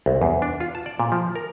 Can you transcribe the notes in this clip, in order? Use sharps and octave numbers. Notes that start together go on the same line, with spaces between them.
C2
E2
D4
F4
A5
D5
A#2
F3
A#4